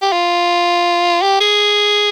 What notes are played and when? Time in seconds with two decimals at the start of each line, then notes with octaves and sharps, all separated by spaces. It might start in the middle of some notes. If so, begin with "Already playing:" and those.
0.02 G4
0.12 F4
1.22 G4
1.41 G#4